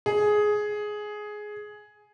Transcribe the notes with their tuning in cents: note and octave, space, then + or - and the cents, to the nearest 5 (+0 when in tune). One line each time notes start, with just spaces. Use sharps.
G#4 +10